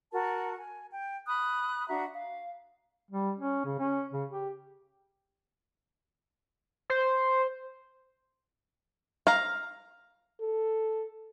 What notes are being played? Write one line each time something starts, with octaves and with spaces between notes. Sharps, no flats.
F#4 A#4 A5
G#5
G5
B5 D#6 F#6
D4 F#4 E5 A#5
F5
G3
C#4
C#3
C#4
C#3
G4
C5
F5 A#5
A4